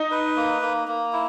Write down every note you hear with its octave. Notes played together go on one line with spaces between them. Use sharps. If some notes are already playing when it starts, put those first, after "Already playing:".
Already playing: D#4
B4
A#3
A#3
A#3
E4